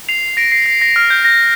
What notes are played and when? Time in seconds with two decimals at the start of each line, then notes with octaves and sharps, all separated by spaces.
0.09 C7 F7
0.37 A#6 D7
0.52 C7
0.66 C7
0.82 A#6
0.96 F6
1.10 G6
1.24 A#6